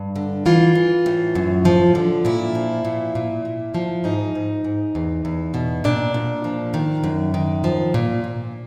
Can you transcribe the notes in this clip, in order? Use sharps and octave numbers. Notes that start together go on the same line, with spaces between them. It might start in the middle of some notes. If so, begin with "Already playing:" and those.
Already playing: G2
D3
E3 F4
E3
A2
F#2
F3
D3
A#2 E4
F3
A#2
A#2
A#2
F3
G#2 D#4
G#2
G#2
E2
E2
B2
A#2 D4
A#2
F3
D#3
F#2
D#3
F3
A#2
A#2